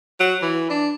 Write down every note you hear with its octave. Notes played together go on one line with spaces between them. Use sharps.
F#3
E3
D4